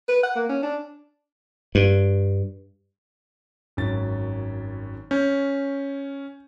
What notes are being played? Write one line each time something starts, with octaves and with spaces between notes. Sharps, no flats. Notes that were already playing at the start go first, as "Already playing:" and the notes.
B4
F#5
A#3
C#4
D4
G2
G#1 F#2 A6
C#4 G6